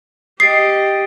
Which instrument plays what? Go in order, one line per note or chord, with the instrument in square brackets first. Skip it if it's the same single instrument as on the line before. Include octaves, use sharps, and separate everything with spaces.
[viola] G4 D#5 [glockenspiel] D#6 A6 D7 [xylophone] C7